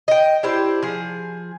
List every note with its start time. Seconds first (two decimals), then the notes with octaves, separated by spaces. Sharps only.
0.08 D#5 G5
0.43 D4 E4 G4 C5
0.82 F3 G#4